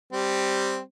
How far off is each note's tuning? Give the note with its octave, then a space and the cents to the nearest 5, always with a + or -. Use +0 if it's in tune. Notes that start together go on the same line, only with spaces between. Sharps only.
G3 +0 C4 +0